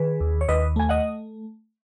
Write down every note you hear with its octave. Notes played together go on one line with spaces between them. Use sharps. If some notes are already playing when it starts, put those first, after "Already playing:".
Already playing: D#3 G#4 B4
D#2
C#5
D#2 B4 D#5
A3 G#5
D#5 F#5